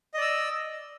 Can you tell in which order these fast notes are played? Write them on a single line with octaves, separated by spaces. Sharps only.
D#5 D5 E6